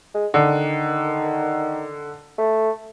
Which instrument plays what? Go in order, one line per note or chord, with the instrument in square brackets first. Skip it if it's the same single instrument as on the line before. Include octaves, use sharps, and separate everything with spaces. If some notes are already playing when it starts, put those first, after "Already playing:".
[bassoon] G#3
[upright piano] D3 [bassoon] D#3
[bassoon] A3